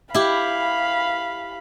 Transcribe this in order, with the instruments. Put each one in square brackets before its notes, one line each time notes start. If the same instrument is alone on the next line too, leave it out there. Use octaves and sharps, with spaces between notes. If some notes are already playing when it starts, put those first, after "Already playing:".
[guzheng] E4 G4 [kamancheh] F5 B5